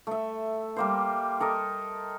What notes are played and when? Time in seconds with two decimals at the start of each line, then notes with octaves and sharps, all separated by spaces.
0.07 A3 E5
0.76 G3 A#3 C5
1.40 A4 A#4 D#5